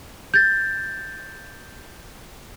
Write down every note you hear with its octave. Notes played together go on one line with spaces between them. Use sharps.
G6 A6